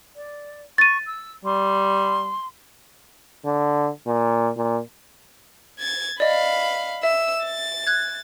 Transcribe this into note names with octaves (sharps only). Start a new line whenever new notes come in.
D5
C#6 A6 D#7
E6
G3 C6
D3
A#2
A#2
G#6 A6
D5 D#5 F5 B5
E5 E6
A6
F#6 G#6